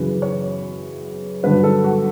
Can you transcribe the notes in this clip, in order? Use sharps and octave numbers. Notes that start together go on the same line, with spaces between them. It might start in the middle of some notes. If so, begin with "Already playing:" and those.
Already playing: F#2 C#3 E3 B4
C#5
G2 D3 F#3 B4
A4
F#4